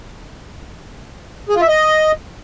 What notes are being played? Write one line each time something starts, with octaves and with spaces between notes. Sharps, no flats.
G#4
F4
E5
D#5